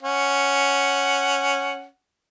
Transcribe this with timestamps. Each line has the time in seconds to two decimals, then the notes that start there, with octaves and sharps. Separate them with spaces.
0.03 C#4 F#5